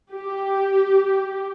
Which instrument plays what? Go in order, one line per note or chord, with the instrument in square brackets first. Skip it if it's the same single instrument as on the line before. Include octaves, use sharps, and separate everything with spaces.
[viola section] G4